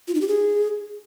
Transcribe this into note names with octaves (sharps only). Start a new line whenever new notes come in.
F4
D#4
G4
G#4